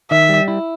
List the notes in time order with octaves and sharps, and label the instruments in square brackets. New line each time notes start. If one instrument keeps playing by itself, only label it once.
[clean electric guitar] D#3 [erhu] E5
[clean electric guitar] G3
E4